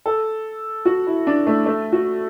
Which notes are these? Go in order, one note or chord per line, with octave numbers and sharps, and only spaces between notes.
A4
F#4
E4
D4
A3
A3
F#4